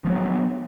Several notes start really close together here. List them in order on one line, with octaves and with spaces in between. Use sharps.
F3 A#3 F#3 B3